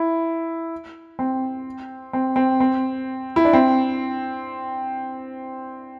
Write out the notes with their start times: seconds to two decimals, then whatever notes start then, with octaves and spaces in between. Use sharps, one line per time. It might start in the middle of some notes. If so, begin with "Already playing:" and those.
Already playing: E4
1.19 C4
2.13 C4
2.36 C4
2.60 C4
3.36 E4
3.45 D4
3.53 C4